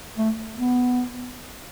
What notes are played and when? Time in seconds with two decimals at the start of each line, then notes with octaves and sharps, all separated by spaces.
0.18 A3
0.57 B3